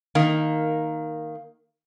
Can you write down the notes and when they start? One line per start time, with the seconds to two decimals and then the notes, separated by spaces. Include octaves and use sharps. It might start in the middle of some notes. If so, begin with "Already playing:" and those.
0.15 D#3 A#3